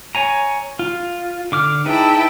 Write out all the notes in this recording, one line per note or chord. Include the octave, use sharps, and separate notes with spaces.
C#5 G#5 A#5
F4
D3 D6 F6
D#4 E4 G#4 B4 G5 A5